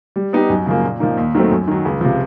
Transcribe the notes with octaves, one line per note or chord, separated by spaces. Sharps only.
G3
B3 D#4 G4
F#2
C#3 F3 A#3
A#2
F3 A#3 D#4
D#2
D#3 F#3 A3 C4
F#2
D#3 F#3
C#2
C3 F3